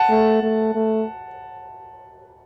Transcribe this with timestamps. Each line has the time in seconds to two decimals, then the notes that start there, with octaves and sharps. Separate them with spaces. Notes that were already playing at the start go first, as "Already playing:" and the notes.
Already playing: F#5 A5
0.10 A3
0.43 A3
0.75 A3